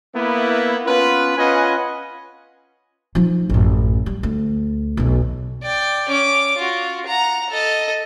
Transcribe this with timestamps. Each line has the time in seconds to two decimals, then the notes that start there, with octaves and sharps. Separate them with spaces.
0.14 A#3 B3 E4
0.85 B3 C#4 F4 B4
1.37 C#4 F4 B4 D#5 F#5 G#5
3.15 F3 D#4
3.50 A1 F#2
4.06 G3
4.23 D2
4.97 B1 E2
5.63 D5 G5
6.09 C#4 D6
6.57 F4 F#4
7.06 F#5 A#5
7.50 A4 D#5